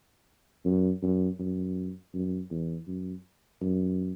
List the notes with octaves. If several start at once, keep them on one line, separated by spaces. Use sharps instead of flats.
F#2
F#2
F#2
F#2
E2
F#2
F#2